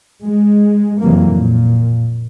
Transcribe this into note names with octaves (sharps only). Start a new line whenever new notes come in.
G#3
F2 C3 E3 F#3 A#3
A#2